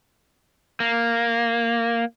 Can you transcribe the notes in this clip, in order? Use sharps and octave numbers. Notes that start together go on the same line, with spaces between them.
A#3